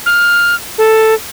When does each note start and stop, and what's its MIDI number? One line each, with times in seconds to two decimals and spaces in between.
0.06 0.55 89
0.78 1.14 69